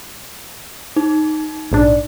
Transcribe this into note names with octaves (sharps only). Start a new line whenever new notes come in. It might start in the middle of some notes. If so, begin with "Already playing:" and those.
D#4
A#1 G#2 D4